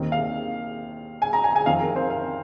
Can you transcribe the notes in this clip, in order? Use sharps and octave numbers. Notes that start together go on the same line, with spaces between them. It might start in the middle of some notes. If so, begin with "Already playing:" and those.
Already playing: D#2 D#3 C4
F5
G#5
A#5
G#5
G#5
F2 D#3 C4 F5
A#4
C5
F5